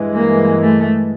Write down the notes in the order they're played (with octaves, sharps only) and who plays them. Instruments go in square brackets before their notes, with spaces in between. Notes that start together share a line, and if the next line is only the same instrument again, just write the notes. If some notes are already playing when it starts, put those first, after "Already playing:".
Already playing: [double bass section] G2 E3 G#3
[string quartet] A#3
A3